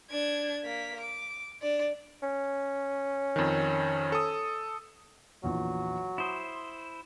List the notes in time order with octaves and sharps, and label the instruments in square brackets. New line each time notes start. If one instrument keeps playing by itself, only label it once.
[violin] D4 G#6
A#3 B6
D6
D4 D5
[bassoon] C#4
[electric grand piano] F2 D#3
A4 D#6
[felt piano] A#1 E2 A#2 [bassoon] F#3
[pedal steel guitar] E4 C5 [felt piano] D#6